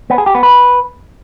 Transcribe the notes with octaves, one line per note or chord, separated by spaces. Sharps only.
B3
G#4
G4
B3
B4